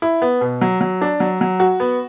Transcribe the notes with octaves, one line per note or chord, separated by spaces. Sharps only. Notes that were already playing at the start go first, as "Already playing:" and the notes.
E4
B3
B2
F#3
F#3
D4
F#3
F#3
F#4
B3